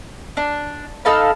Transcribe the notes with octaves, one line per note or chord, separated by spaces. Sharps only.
D4
D#4 A4 F5 B5